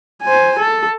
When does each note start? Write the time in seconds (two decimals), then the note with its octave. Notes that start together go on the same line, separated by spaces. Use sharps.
0.23 C5 G#5
0.59 A4